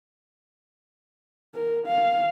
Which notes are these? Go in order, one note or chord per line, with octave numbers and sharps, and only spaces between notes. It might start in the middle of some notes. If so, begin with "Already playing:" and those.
A#4
F5